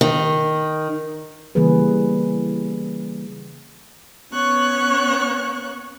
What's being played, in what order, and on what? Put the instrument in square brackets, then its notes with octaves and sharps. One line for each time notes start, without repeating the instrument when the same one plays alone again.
[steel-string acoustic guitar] D#3
[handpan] C#3 E3 G3 A#3 G#4 B4
[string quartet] B3 C#4 C#5 C#6 F#6